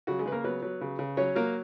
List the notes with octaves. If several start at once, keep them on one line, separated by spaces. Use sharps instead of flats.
C#3 F#3 F#4
G#3 G#4
C#3 B4
A#3 A#4
F#3 B3 B4
F#3
C#3
C#3
F#3 C#4 C#5
F#3 A#3 A#4